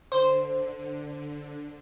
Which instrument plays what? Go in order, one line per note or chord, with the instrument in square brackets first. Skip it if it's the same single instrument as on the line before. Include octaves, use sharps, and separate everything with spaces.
[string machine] D3 [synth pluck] C5